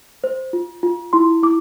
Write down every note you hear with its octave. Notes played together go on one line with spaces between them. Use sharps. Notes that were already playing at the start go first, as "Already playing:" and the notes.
C5
F4
F4
E4 C6
E4 D6